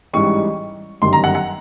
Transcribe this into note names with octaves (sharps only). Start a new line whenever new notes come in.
A1 G#2 E3 G3 C#6
G1 F#2 D#3 G3 C6
A#5
F#5
F#5